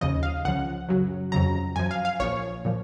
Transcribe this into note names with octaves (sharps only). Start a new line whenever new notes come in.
D#2 C#3 F3 D#5
F5
C#2 C#3 F3 F#5
F#2 C#3 F#3
F2 C#3 F#3 A#5
F#2 F3 G#5
F5
F5
A#1 A#2 F3 C#5
A#2 F3